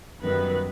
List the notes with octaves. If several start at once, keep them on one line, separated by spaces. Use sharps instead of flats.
F#2 D#3 G3 B3 B4